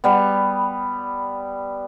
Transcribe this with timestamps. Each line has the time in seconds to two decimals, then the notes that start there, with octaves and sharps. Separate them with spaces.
0.04 G3 B3